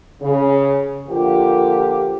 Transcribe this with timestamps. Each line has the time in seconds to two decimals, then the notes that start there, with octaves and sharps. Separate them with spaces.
0.20 C#3
1.07 D3 F3 A#3 F4 G4